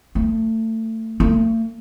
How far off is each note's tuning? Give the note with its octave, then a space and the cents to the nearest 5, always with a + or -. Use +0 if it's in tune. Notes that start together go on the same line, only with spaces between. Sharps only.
A3 +25
A3 +45